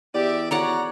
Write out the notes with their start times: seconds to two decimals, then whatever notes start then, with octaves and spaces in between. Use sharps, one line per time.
0.14 E2 G4 D5 E5
0.51 F#4 C#5 D5 F#5 A#5